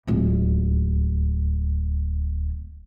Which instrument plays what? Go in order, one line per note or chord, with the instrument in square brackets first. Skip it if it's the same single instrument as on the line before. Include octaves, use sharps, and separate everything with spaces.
[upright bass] D1 C#2